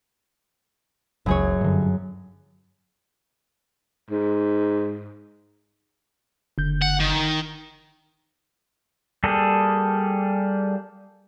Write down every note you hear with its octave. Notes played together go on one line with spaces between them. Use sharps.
F#1 C#2 F#2 G#4 C#5
G2 D3
G#2
F#1 D3 G6
F#5
D#3
G3 A#3 G#4 A4